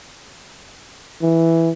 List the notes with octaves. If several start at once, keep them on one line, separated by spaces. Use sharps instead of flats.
E3